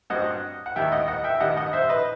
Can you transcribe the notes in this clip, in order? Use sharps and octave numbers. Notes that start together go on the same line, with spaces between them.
G2 F#3 C4 D#5 F#5
F#5
D#2 D#3 G3 E5 G5
D#5 F#5
D#5 F#5
E5 G5
G2 D#3 G3 D#5 F#5
D#5 F#5
C5 E5
B4 D#5